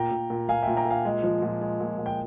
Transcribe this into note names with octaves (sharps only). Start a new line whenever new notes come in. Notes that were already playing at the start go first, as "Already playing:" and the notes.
Already playing: A#2 G5 A#5
A#2
A#2
A#2 F5 G#5
E5 G5
A#2
G5 A#5
A#2
F5 G#5
G#3
F3
A#2
G#3
A#2
A#2
G5